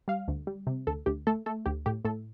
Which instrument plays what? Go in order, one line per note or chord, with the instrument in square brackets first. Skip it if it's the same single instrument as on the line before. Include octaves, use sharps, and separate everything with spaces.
[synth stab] G3 F5
D2
G3
C3
D2 A4
D2 G4
A3 A4
A3 A4
D2 G4
A2 G4
A2 A4